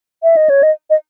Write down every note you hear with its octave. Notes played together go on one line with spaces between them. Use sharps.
E5
D#5
C#5
D#5
D#5